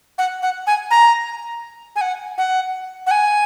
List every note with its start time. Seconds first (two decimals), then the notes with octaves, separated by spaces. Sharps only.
0.18 F#5
0.42 F#5
0.67 G#5
0.91 A#5
1.96 G#5
2.01 F#5
2.38 F#5
3.07 F#5
3.11 G#5